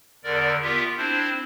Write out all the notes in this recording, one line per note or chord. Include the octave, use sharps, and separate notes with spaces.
E2 D3 A#4 D5
B3 F4 G4 A#4 E5
C4 D4 E4 C5